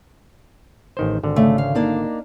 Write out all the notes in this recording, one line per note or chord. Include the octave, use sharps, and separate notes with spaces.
A1 D#3 C5
G#1 D3
C#3 A3
F5
A#3 D4 D#4